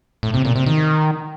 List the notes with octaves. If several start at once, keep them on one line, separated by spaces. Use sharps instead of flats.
A2
C3
A#2
C3
D#3